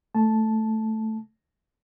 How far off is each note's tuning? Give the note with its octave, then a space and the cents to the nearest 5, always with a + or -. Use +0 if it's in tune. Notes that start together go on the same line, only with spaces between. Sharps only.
A3 +0 A5 -5